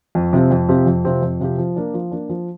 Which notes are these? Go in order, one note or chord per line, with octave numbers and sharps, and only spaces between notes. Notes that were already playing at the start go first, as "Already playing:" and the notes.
F2
C3 F3 C4 G4
F2
C3 F3 C4 G4
F2
C3 F3 C4 G4
F2
C3 F3 C4 G4
F3
A#3 D4
F3
A#3 D4
F3